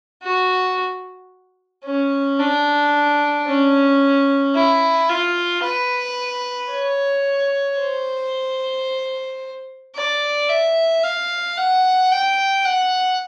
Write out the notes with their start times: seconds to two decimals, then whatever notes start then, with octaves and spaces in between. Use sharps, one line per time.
0.23 F#4
1.85 C#4
2.39 D4
3.47 C#4
4.55 E4
5.09 F4
5.63 B4
6.71 C#5
7.79 C5
9.95 D5
10.49 E5
11.03 F5
11.57 F#5
12.11 G5
12.65 F#5